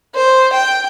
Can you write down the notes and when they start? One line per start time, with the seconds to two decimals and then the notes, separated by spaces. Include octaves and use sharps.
0.15 C5
0.54 G5